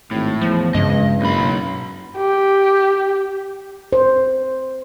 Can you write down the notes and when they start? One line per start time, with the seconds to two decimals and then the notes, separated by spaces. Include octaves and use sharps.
0.11 G#1 A2
0.41 E2 F3
0.75 C#2 G2 D#5
1.21 F#1 B1 B5
2.17 G4
3.93 C5